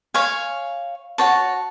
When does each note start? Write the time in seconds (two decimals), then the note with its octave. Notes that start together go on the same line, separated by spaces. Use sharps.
0.14 C#5 F5 G#5
1.18 F#4 C#5 A5